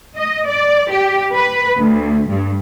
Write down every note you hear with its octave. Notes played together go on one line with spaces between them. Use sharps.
D#5
D5
G4
B4
D2
G2